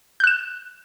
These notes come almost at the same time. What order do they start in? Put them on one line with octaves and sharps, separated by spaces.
G6 F#6 E7